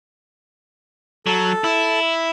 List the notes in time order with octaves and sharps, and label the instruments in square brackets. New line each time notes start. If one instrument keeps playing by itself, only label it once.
[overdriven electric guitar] F#3 [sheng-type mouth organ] A4
[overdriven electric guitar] E4